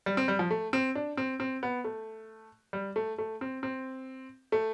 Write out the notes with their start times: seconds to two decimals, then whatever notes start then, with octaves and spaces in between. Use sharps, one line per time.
0.06 G3
0.17 C4
0.28 G3
0.39 F3
0.50 A3
0.73 C4
0.95 D4
1.17 C4
1.40 C4
1.63 B3
1.84 A3
2.73 G3
2.96 A3
3.18 A3
3.41 C4
3.63 C4
4.52 A3